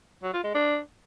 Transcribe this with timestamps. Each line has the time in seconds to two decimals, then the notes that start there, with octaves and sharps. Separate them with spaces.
0.23 F#3
0.33 F4
0.44 G#3
0.54 D4